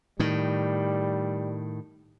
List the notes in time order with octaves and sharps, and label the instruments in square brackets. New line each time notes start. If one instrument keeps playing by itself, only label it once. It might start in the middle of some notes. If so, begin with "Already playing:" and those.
[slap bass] A2 D#3 [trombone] G3